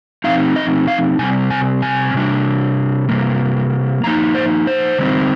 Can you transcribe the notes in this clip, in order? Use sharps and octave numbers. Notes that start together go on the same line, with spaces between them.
F3 C4 D#4 F5
D#5
F5
C3 G3 C4 G#5
G#5
G#5
C3 G3 D4
C3 G3 A#3
F3 A#3 D#4 A#5
C5
C5
D3 G3 C4 D#4